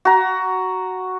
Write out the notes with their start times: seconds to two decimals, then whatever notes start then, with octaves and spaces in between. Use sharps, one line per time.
0.05 F#4 A#5